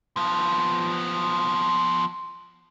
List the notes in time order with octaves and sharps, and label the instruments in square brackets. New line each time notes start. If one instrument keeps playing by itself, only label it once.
[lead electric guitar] F3 B3